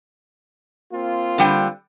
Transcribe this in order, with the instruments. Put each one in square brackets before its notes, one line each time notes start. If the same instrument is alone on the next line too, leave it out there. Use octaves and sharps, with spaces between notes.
[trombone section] A#3 C4 F4
[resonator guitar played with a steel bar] D3 G3 G5